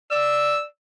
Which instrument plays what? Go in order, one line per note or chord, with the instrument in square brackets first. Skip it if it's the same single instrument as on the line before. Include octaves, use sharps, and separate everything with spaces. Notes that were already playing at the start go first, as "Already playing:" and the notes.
[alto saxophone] D5 [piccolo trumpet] E6